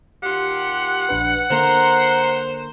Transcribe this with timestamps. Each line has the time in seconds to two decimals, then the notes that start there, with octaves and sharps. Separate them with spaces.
0.23 D#2 F4 G4 F#5
1.09 A#1 D4 B4
1.50 D3 A#3 C5 A#5 C6